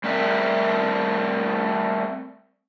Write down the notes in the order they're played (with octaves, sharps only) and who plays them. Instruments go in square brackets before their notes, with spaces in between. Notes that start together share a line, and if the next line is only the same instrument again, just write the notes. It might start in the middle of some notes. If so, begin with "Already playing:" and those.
[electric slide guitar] G3 A3 C4 A#4 E5